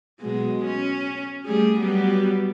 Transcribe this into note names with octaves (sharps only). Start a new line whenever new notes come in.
B2 F#3 G#3
C#4
G3 A3 G#4
F#3 G3 B3